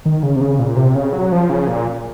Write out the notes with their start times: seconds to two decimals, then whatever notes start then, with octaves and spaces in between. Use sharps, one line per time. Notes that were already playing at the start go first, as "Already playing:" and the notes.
0.05 D#3
0.23 C#3
0.36 C3
0.41 C#3
0.59 A#2
0.77 C3
0.95 C#3
1.13 F#3
1.32 F3
1.50 C#3
1.68 A#2